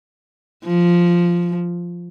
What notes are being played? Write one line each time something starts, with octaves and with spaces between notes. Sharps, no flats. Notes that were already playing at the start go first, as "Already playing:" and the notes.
F3